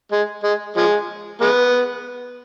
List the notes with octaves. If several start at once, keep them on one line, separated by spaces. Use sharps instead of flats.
G#3
G#3
F3 G#3
G#3 B3